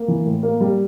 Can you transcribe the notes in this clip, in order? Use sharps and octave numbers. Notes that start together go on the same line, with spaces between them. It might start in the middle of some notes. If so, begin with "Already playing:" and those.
Already playing: A#3
E3
A2
A#3
G3